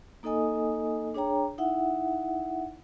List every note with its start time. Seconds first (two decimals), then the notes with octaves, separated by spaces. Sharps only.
0.23 A#3 D#4 A4 D#5 G#5 D#6
1.15 D4 G#4 C#5 G5 A#5
1.58 D#4 E4 E5 F#5